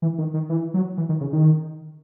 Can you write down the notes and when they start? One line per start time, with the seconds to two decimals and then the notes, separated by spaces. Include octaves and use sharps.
0.02 E3
0.18 D#3
0.34 D#3
0.49 E3
0.74 F#3
0.98 E3
1.09 D#3
1.21 C#3
1.33 D#3